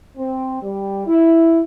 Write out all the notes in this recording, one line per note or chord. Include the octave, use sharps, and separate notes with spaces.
C4
G3
E4